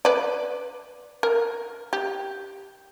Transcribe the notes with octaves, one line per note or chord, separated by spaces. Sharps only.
B4 D5
A#4
G4